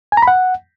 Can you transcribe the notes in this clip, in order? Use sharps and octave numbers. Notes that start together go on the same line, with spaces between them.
G#5
A#5
B5
F#5